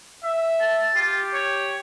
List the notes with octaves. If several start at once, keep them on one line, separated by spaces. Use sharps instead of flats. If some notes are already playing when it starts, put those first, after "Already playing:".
E5
A5
F4 G4
C#5